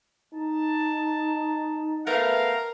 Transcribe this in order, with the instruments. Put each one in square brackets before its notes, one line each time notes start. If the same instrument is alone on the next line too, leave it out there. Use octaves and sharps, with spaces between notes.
[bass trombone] D#4 [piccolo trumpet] A5
[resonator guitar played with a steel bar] A3 B3 [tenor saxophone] A#4 [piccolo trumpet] F5